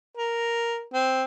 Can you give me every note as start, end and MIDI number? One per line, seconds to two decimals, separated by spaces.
0.17 0.82 70
0.94 1.24 60